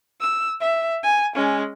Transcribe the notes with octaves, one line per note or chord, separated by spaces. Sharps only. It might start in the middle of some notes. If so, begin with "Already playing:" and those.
E6
E5
G#5
G#3 C#4